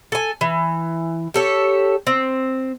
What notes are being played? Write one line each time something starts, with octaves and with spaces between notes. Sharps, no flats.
A4 G#5
E3
G4 A4 C#5
C4